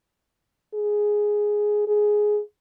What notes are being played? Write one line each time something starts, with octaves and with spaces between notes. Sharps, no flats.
G#4
G#4